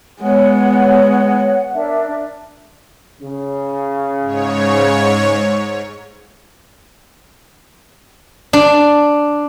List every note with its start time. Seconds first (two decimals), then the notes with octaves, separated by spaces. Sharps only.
0.21 G#3 B3 C#5 F#5
1.74 D4 A#4 E5
3.21 C#3
4.21 G#2 C#5
8.53 D4